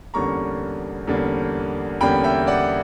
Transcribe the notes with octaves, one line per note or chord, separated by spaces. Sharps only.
E2 D3 G3 A#3 C#4 A#5 C#6
E2 D3 G3 A#3 C#4
E2 D3 G3 A#3 C#4 G5 B5
E5 G5
D5 F#5